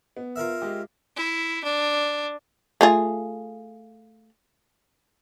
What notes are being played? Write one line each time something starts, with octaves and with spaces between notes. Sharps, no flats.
B3
F4 A#4 E5
G#3 G4 D#5
E4
D4
A3 F4 G#4